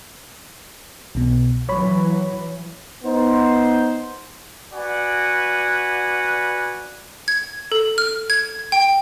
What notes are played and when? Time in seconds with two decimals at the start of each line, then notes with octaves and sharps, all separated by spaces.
1.15 B1 B2
1.69 E3 F#3 C#5 B5
3.04 B3 D#4 C5
4.73 F#4 B4 D5 F#5 G#5
7.28 G#6
7.72 A4
7.98 F6
8.30 G#6
8.72 G5